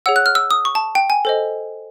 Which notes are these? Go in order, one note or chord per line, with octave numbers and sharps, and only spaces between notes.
G#4 C#5 F#5 E6
F#6
F6
E6
D#6
C#6
A5
G5
G#5
A4 C5 D#5